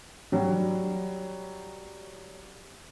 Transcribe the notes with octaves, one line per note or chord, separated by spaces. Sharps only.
F#3 G3